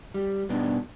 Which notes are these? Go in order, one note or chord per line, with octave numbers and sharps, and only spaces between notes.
G3
G2 B2 B3 D4 D#4